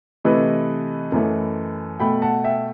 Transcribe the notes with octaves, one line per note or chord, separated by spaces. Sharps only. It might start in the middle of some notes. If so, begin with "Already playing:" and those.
C3 E3 A3 B4 D#5
F#2 E3 A3
B2 A3 G5 B5
F#5 A5
E5 G5